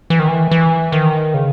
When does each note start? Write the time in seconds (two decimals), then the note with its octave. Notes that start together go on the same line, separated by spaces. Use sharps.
0.10 E3
0.19 D#3
0.29 E3
0.51 E3
0.92 D#3
1.34 C#3